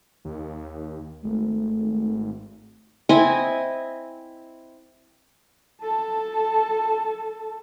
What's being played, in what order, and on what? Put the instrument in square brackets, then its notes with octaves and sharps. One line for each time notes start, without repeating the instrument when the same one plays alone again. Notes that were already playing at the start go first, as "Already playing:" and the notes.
[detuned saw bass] D#2
[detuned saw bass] G#1 [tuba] A3
[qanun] C4 E4 D#5 G#5
[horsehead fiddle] A4 A5